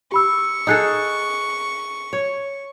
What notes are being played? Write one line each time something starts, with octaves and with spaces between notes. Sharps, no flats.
G4 B5 C#6 E6
D#4 G#4 A4 D#6 F#6 C#7
C#5